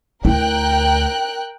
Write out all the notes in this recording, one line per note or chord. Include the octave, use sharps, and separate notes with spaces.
D2 E4 A#4 G5 F#6